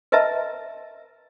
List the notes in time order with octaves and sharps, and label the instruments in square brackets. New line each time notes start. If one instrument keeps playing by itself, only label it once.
[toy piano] A#4 B4 D#5 E5 A5 A#5